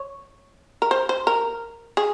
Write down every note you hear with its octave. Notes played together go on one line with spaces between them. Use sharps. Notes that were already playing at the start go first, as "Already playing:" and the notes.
Already playing: C#5
A#4
C5
C5
A#4
G#4